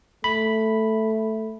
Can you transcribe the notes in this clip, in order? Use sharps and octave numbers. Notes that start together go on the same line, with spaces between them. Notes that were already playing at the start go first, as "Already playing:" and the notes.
A3 B5